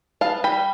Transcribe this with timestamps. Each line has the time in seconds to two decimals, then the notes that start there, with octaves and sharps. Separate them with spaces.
0.21 B3 F5 A5
0.44 G5 B5
0.52 G3